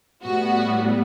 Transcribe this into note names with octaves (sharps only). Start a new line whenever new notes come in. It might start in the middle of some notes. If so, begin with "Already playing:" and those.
A2 G3 B3 F#4